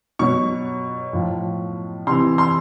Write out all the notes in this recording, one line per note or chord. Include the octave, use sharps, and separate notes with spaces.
B2 F#3 C#6
A2 F3
C3 E3 C6
C6